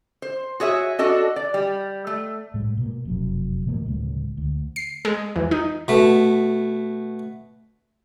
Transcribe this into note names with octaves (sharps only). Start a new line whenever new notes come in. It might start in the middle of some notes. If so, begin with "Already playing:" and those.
C5
F#4 G#4 C#5 E5
D4 F#4 A4 D#5
D5
G3
A3
A2 G#3
B2 A#3
F1 F#2 F#3
B2 E3 A3 A#3
D1 C#3 G#3
D2
C7
G#3
E2
D#4
B2 A3